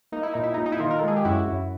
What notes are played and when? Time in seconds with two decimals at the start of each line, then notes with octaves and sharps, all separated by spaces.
0.12 A#3 D#4
0.23 E4
0.34 A#2 D#4
0.43 E4
0.54 D#4
0.58 A#2
0.66 D#4
0.72 E4
0.80 D#3 D#4 F4
0.91 A#4
0.99 A4
1.03 G#3
1.08 G#4
1.16 G4
1.25 F#2 E4 F#4
1.47 F#2